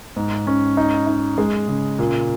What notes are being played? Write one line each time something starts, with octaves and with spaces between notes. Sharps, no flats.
G#2
C#4
D#4
D#4
G#3
C#3
A#2